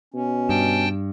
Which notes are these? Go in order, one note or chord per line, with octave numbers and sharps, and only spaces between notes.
B2 C#4
G2 G5 A5